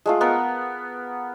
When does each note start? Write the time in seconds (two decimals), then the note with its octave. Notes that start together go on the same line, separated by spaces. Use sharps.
0.06 G#3 A3 F4
0.21 B3 A#4 F#5